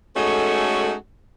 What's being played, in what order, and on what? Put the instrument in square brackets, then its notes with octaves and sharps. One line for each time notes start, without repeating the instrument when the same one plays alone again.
[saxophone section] G#3 A3 C#4 D#4 F#4 A4